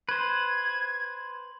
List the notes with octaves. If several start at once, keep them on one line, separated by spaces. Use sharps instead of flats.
B4 C5 G#6